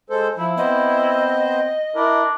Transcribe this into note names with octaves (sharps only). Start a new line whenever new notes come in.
G#3 A4 C5
F3 E4
B3 C4 C5 D#5
D4 E4 A#4